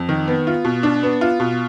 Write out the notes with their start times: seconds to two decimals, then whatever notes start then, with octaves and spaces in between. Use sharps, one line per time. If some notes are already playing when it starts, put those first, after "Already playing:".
Already playing: F2
0.09 D#3
0.28 B3
0.47 F4
0.65 B2
0.83 D4
1.03 B3
1.21 F4
1.40 B2